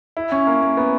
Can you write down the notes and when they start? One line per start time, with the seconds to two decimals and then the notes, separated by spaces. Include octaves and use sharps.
0.17 E4
0.32 C#4
0.47 A#3
0.62 A#3
0.77 B3